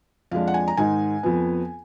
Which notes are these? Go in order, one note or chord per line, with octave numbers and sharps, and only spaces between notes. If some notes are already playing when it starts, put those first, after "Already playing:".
F2 F3 G#3 D4 F5
F#5
G#5
A#5
G#2 D#3 G#3 D#4 G#5
F2 F3 B3